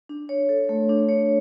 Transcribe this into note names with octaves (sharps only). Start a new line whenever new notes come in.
D4
C#5
A4
A3
D4
C#5